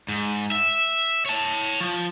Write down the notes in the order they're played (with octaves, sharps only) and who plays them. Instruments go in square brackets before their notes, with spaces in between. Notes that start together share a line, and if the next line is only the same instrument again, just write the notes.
[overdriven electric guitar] G#2
E5
C#5 A5
F3